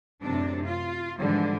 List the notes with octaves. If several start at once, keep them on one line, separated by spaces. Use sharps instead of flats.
F#2 A2 C3 D4
F4
G#2 D3 E3 F3 G3